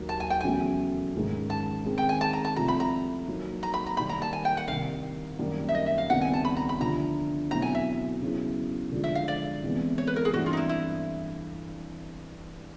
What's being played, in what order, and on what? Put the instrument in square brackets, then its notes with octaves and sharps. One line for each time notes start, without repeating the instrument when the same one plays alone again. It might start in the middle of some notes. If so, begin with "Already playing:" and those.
Already playing: [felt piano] D#2 D#3 F#3
[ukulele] A5
G#5
G5
[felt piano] E2 C#3 F#3 A3 C#4 [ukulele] G#5
[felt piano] G#2 D#3 G#3 C#4
[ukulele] A5
[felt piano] D#3 G#3 C4 D#4 G#4
[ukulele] G5
G#5
A5
A#5
A5
[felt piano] C2 C3 F3 A3 [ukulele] A#5
[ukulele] B5
A#5
[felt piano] F#3 A#3 D#4
[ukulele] A#5
B5
A#5
[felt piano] D#3 G3 A#3 [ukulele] B5
[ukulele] A#5
A5
G#5
G5
F#5
[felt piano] C2 C3 D#3 [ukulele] F5
[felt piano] F#2 D#3 G3 A#3
[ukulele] E5
D#5
E5
F5
[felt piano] C#2 C3 D#3 G3 B3 [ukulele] F#5
[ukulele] G#5
A5
B5
A#5
B5
[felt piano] D3 F3 A3 D4 [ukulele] A#5
[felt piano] B2 F#3 A3 C4 E4 [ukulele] A#5
[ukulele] G#5
E5
[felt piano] C#3 F#3 B3 E4 G#4
D3 F3 G#3
[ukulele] E5
F5
D5
[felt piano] C3 E3 G#3 B3 E4
[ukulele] C#5
B4
A#4
G#4
[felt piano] G2 E3 A3 C4 [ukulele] F#4
[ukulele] F4
D#4
E4
E4